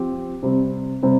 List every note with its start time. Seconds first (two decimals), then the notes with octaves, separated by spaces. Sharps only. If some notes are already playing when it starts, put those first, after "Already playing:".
Already playing: F3 C4 G4
0.43 C3 G3 C4
1.03 C3 G3 C4